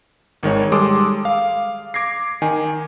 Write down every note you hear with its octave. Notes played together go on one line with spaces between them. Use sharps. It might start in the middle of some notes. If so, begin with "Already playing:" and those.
G#1 D#3 G#3 C#5
G3 G#3 A4 C6 D6 D#6
F5
D6 G#6 A#6 C7
D#3 G#5